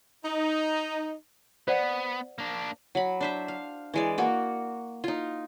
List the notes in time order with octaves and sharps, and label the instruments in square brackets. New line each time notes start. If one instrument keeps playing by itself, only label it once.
[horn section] D#4
[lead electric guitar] B3 [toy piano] C5 D5 F#5
[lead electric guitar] A#3 D4
[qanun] F#3 B5
D4 C5 E5
F5
E3 G#3 D5
A#3 F#4
D#4 F4